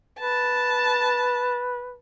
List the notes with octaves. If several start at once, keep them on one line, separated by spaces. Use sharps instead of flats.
B4 A5